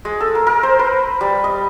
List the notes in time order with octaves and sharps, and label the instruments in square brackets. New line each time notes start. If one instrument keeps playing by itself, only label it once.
[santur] G#3
A4
A#4
A#4
C5
B4
G3
D#5